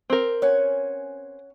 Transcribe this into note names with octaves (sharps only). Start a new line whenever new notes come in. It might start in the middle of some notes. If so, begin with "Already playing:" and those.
C4 A#4
C#4 F#5 G#5